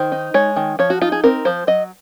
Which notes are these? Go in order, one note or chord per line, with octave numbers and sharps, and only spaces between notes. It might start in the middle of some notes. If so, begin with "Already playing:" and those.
Already playing: D#3 C5
D#4
G#3 C#5
D#3
F3 C#5
F#4
D#4 F4
G#4
C4 A#4
F3 C5
F#3 D#5